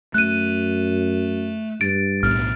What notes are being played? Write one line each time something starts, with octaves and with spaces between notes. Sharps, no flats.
F#2 A3 F#6 D#7
G2 A6 D7
B1 A2 B3 F6